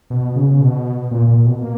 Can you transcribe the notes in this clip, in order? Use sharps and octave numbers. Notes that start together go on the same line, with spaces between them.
B2
C#3
C#3
B2
A#2
A#2
B2
A#3